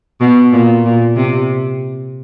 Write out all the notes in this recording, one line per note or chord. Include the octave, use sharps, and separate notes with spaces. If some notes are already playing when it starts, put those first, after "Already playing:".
B2
A#2
A#2
C3